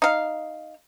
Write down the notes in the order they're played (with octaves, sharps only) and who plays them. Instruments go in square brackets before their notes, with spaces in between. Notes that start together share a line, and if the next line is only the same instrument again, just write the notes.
[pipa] D#4 F5